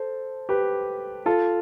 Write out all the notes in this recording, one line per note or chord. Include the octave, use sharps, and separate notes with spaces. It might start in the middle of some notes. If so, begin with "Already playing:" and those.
Already playing: A4 C5
G4 B4
F4 A4